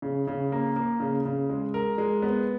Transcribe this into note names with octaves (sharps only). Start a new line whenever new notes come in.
C#3
C#3
A#3
A#3
C#3
C#3
G#3
A#4
G#3
B3